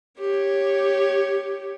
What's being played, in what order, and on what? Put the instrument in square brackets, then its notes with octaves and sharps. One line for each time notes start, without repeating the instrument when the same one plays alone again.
[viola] G4 C#5